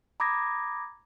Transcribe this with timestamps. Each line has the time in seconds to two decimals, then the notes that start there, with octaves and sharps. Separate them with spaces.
0.20 A#5 B5 D6 D#6 G#6 A#6